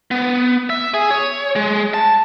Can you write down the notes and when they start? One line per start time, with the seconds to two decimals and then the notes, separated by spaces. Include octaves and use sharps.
0.11 B3
0.70 E5
0.94 G#4
1.11 C#5
1.56 G#3
1.94 A5